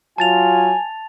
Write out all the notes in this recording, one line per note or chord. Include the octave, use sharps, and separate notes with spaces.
F#3 F4 G#5 A5 A6 F7